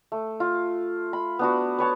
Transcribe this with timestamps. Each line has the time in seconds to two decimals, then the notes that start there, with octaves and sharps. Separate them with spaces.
0.12 A3
0.40 F4
1.13 B5
1.39 B3 D4 F#4
1.79 B4 C#5 A5